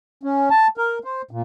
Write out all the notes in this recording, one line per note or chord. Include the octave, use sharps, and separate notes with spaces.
C#4
A5
A#4
C5
A#2